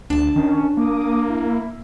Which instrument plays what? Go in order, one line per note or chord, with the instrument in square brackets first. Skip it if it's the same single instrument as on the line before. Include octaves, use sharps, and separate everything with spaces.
[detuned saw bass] D2 [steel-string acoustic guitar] D4 A5
[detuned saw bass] D#3 [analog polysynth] C#4
[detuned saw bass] A#3 [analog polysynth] D6 D#6
[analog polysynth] E4